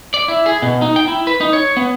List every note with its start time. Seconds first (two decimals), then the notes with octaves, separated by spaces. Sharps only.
0.14 D5
0.28 E4
0.46 G#4
0.62 B2
0.82 D#4
0.96 G5
1.08 E4
1.27 B4
1.41 D#4
1.53 C#5
1.77 B3